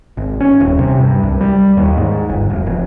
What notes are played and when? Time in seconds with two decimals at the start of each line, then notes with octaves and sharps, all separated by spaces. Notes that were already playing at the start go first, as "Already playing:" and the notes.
0.17 G#1
0.40 C#4
0.60 D#1
0.79 C3
0.99 G2
1.23 C2
1.41 G3
1.77 D#2
1.97 G#2
2.29 G1
2.50 E1
2.66 F1